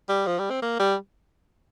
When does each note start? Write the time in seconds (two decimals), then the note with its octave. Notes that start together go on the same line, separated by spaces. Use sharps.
0.09 G3
0.27 F3
0.39 G3
0.50 C4
0.62 A#3
0.79 G3